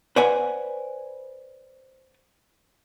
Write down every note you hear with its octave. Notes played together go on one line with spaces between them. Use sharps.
B4 C5 D5 F#5 G#5